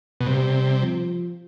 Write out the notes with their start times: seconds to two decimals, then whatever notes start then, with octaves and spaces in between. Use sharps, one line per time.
0.21 B2
0.27 C3 G3
0.81 F3